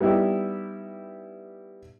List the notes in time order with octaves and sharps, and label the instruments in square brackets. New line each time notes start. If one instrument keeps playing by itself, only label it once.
[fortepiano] G3 B3 D#4 E4 G4